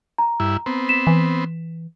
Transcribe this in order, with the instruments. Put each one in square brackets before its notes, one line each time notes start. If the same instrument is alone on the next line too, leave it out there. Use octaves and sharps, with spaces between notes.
[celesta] A#5
[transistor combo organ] G2 E4
B3 C4
[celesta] B6 E7
[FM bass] E3